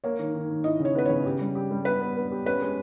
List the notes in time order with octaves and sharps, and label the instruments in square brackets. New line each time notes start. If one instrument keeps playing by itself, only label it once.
[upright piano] A#3 [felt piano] C#5
[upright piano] D#3
D#3
D#3
[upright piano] E4 [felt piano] D#5
[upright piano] C#3
[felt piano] C#5
[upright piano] B3 [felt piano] B4
[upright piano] C#3 [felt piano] C#5
[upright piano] G4
G3
G4
G3
[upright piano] B3 [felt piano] B4
[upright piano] B3
B3
G4
[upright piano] C#4 [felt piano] B4
[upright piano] G#3